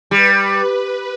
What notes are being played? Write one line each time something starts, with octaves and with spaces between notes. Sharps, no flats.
G3 B4